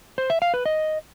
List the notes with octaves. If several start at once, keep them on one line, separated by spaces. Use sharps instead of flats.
C5
E5
F5
B4
D#5